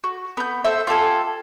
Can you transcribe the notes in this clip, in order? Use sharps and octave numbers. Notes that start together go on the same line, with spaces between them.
F#4
B3 G6
A4 C5 E5
F4 G4 A4 G#5